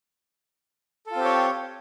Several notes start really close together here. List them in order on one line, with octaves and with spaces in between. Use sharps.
A4 F4 C4 G4 C#5